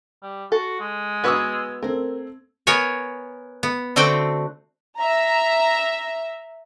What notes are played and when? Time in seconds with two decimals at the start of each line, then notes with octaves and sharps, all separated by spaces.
0.23 G3
0.52 F#4 A4
0.80 G#3
1.24 B3 F#4 B4 D#6 E6 G#6
1.83 A3 C4 A#4
2.67 B3 A#4 C#5 G#5
3.63 B3
3.96 D3 A3 C4 F#4 G5
4.99 E5 A#5